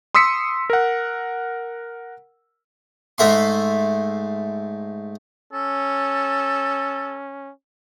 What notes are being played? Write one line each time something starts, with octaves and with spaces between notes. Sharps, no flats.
C6 D#6 E6 B6 C#7
A#4 F#5
G#2 A3 E5 C6
C#4 A4